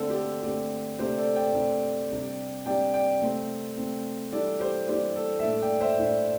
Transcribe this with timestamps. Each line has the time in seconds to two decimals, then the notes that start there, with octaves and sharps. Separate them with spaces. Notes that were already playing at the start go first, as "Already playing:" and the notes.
Already playing: D3 A3 C4 A4
0.10 G4
0.16 A4
0.43 D3 A3 C4 G4
0.99 C3 A3 D4 G4 C5
1.17 A4 D5
1.36 D5 G5
1.54 C3 A3 D4
2.10 C3 G3 D4
2.66 C3 G3 D4 D5 G5
2.93 D5 G5
3.21 C3 A3 C4
3.77 C3 A3 C4
4.32 E3 G3 D4 A4 D5
4.60 G4 C5
4.88 E3 G3 D4 G4 C5
5.16 A4
5.39 E5
5.43 A2 A3 D4 A4 D5
5.62 D5 G5
5.81 C5 E5
5.99 A2 A3 D4